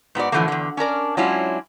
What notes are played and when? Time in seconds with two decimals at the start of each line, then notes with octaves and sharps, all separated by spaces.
0.15 G#2 B3 F#4 D5
0.32 A2 D3 E3 F3 A3 A#3
0.48 E2 D3
0.77 C#4 D4 A#4 D5
1.17 F#3 G#3 C#4 D4 E4 F4